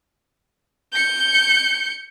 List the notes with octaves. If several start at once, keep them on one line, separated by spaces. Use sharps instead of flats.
G6 C#7